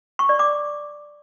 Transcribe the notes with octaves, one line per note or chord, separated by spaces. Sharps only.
C#6
D5
D6